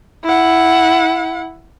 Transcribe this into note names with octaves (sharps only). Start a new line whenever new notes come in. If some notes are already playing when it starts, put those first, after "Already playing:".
E4 F#5